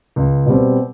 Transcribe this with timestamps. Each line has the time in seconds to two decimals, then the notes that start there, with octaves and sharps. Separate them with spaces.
0.16 C#2
0.46 B2 G3 C4